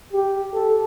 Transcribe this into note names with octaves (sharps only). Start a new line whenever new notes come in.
G4
A4